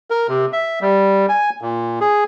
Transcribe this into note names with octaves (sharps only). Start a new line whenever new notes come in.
A#4
C3
E5
G3
G#5
A#2
G#4